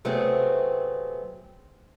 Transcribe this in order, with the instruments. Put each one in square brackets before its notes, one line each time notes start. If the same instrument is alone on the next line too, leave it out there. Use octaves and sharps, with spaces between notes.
[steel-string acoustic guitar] C3 F#3 A3 B3 C4 G#4